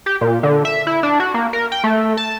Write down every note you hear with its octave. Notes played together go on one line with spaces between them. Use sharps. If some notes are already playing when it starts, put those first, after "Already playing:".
G4
A#2
D3
E5
E4
D4
F#4
A#3
A#4
G5
A3
A5